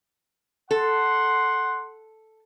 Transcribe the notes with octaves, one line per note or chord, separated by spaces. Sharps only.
A4 F#5 C6